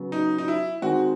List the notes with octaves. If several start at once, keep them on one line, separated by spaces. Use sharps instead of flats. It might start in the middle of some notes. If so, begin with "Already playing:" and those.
Already playing: C#3 F#3 B3
D#4
D#4
E4
D#3 G#3 C4 F#4